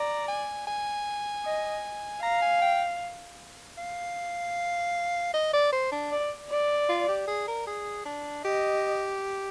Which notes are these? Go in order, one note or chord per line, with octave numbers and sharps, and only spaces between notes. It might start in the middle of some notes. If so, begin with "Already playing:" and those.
Already playing: D5 A#5
G#5
G#5
D#5
F5 A#5
G#5
G5
F5
D#5
D5
C5
D4
D5
D5
F4
G4
G#4
A#4
G#4
D4
G4 D#5